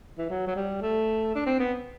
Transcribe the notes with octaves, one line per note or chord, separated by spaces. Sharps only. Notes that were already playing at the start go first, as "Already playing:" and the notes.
E3
F#3
F#3
G3
A3
D4
C4
B3